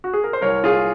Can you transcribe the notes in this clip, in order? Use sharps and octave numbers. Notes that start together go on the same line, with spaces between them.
F#4
G#4
A#4
C5
C2 A#4 C#5
F4 G#4